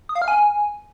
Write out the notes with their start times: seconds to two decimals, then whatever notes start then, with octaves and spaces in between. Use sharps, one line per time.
0.09 D#6
0.15 F5
0.22 F6
0.28 G#5